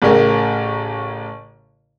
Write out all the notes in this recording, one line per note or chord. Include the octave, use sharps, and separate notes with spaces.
A1 A2 C#3 A#4